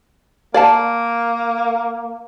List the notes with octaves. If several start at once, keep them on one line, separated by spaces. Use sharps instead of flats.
A#3 D5 F5 A5